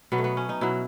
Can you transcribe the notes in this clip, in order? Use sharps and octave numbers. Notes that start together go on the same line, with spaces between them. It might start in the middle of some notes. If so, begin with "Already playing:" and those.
B2 F#3 B3
A3
B3
C#4
D#4
B2 F#3 E4